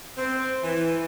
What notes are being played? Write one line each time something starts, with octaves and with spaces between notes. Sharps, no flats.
C4
E3